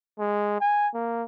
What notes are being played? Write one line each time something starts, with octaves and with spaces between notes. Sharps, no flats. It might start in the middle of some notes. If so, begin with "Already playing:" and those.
G#3
G#5
A#3